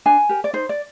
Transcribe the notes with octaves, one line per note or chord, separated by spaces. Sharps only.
D4 G#5
G4 A#4
D5
D#4 C5
D5